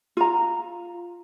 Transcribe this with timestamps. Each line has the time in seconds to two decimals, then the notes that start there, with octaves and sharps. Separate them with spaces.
0.17 F4 A#5